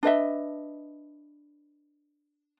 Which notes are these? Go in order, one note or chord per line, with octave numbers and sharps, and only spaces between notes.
D4 B4 D#5 E5